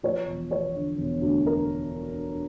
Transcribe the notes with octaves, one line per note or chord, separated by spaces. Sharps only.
F3 C#5
E1
E1 C#5
D3
E1
D2
A#4